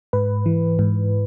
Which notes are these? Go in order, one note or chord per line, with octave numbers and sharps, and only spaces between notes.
G#2 B4
E3
G#2